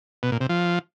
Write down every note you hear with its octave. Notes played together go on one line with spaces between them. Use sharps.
B2
A#2
C3
F3